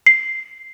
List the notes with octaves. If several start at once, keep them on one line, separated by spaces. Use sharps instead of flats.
C7